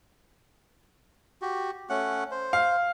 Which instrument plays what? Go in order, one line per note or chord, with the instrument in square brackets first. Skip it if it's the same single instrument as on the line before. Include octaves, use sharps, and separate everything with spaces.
[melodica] F#4 G4
A3 C#4 F#5
C5
[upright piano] F5